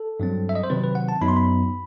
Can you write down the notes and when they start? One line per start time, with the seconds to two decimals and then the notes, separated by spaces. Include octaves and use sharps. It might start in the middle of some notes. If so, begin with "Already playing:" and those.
Already playing: A4
0.20 G2 F#3 C4
0.49 E5
0.55 D#5
0.63 C5
0.70 C3 D#3 F#3 C4 B4
0.83 B4
0.95 F#5
1.09 A5
1.21 F#2 F#3 B3 D#4 B5
1.28 C6
1.37 B5